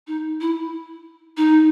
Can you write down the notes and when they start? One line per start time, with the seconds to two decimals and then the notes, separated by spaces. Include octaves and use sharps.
0.07 D#4
0.41 E4
1.37 D#4